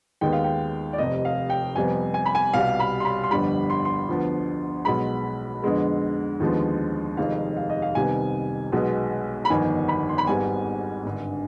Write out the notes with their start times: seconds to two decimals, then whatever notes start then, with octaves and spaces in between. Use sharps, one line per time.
0.21 D#2 D#3 G#3 B3 G5
0.32 F5
0.44 G5
0.93 D5
0.98 F1 F2 C3 D#5
1.25 F5
1.50 G5
1.76 F2 C3 G3 B3 G#5
2.14 G#5
2.26 B5
2.35 G#5
2.53 C2 B2 G3 F5
2.80 B5
3.00 C6
3.05 B5
3.24 C6
3.31 G1 F2 D3 G3 B5
3.70 C6
3.85 C6
4.09 D2 D3 F3 B3
4.85 B1 B2 G#3 B5
5.62 F2 D3 G#3 B3
6.40 D#2 D3 F3 G#3 B3
7.17 F1 F2 D#3 G#3 F5
7.57 F5
7.70 D#5
7.82 F5
7.95 C2 C3 D#3 G3 B3 G#5
8.72 B1 B2 G#3 B3
9.45 B5
9.50 G1 F2 D#3 G#5
9.88 B5
10.09 C6
10.18 B5
10.27 G#1 G#2 G3 B3 G#5
11.05 G#1 G2 D3